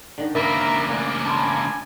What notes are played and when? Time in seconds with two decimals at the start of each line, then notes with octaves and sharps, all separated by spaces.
0.18 D3 D#3
0.35 C#2 A#3 A#4 D5 E5 A#5 B5
0.88 A3 D4 F#5 G#5
1.25 D5 A5 B5 C6
1.39 G#5